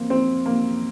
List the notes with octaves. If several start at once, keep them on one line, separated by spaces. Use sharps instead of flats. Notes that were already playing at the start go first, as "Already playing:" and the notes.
Already playing: A#3 C4
C4
A#3